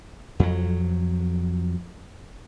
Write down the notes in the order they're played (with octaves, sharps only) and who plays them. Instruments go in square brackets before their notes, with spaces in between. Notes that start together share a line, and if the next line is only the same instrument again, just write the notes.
[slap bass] F2 F#3